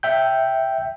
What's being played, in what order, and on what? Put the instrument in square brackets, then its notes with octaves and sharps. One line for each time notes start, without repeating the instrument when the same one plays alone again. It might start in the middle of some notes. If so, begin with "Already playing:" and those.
[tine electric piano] E5 G5 G6